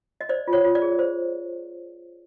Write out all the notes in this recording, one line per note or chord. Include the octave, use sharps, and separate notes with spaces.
D#5
C5 D5
F4
C#5
F4
D5
G#4
C5